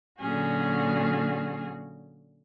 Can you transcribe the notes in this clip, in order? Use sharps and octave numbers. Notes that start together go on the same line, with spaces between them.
A#2 D3 F#3 C#4 F#4 G#4